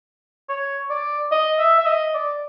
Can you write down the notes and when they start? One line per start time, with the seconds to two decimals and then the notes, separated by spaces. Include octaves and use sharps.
0.49 C#5
0.90 D5
1.32 D#5
1.59 E5
1.80 E5
1.86 D#5
2.14 D5